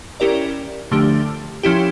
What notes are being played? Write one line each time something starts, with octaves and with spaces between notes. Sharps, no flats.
C#4 E4 G4 A#4 D5
D3 F3 A3 D4 G4
F3 C#4 E4 G4